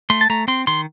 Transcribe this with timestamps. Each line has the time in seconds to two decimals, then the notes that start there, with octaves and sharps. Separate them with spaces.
0.10 A3 C6
0.21 A5
0.30 A3 A#5
0.48 C4 C6
0.67 D#3 C6